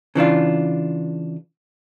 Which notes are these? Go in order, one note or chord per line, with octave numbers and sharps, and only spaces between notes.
C#3 E3 D4 F4